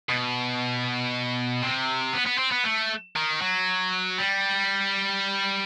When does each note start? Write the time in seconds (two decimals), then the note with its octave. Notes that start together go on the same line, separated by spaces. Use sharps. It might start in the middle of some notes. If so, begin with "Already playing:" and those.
0.09 B2
1.62 C3
2.14 B3
2.27 B3
2.39 C4
2.52 B3
2.64 A3
3.16 D#3
3.42 F#3
4.18 G3